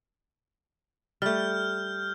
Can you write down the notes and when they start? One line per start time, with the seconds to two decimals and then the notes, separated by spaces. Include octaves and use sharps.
1.22 G3 A3 F6 G6